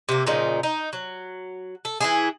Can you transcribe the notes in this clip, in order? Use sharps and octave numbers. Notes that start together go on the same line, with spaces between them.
C3 A#3
A#2 C#3 F3 D#4
D#4
F#3
A4
E3 E4 G#4